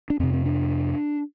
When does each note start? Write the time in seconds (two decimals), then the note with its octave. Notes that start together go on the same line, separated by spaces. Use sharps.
0.10 D4
0.20 F2 C3 C4
0.33 C4
0.46 D4